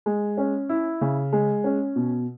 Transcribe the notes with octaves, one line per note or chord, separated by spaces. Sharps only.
G#3
C#4
E4
C#3
G#3
C#4
B2